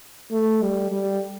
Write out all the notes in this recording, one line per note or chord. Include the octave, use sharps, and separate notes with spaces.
A3
G3
G3